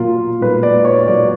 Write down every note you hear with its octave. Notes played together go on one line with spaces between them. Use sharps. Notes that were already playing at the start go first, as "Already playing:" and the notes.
Already playing: A#2 F#3 A#3 F4
A#2 F#3 A#3 B4
D5
C#5
A#2 F#3 A#3 D5